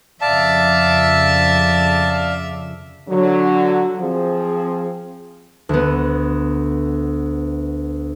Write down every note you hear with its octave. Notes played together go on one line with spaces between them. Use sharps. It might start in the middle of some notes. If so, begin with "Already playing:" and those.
F2 C#3 F3 D5 E5 F5 A5
D3 F#3
F3 C4 G#4
D2 B3